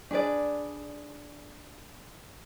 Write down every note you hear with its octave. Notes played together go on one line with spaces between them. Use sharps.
D4 G#4 B4 D5